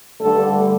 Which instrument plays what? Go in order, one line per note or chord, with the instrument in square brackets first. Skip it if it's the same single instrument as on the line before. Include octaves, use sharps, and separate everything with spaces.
[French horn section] G2 D3 G3 A3 A4